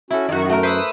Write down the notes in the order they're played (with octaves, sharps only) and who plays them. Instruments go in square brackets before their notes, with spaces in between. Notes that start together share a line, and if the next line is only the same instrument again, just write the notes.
[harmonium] C#4 F#4 [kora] E4 A4
[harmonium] F#2 [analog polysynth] D#3 F#4
[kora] A3 A#4
[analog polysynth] B4 D#6 E6 [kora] C5